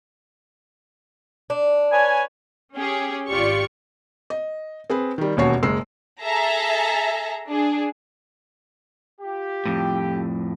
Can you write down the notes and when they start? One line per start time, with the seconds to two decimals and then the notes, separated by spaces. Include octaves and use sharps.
1.50 D4
1.92 B4 C#5 G#5
2.75 C#4 G4 G#4
3.29 G#1 F4 G4 D5 C#6
4.30 D#5
4.90 C4 G#4 B4
5.18 D#3 G3
5.37 E1 D#2 C#4 F#4 C#5 C7
5.63 F#1 G#3 E6 C7
6.22 G#4 A4 E5 A5 A#5
7.48 D4 G#4
9.21 F4 G4
9.66 F2 A2